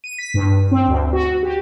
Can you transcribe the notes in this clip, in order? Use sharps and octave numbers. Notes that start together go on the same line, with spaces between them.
D#7
B6
G2
C4
D2
F#4
G4